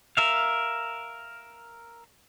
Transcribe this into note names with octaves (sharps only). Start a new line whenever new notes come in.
A#4 E5 F5